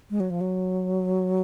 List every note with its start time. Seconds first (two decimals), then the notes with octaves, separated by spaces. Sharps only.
0.10 G#3
0.20 F#3
0.30 F3
0.41 F#3